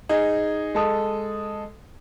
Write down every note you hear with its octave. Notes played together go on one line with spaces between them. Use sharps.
D#4 G#4
G#3 A4 D#6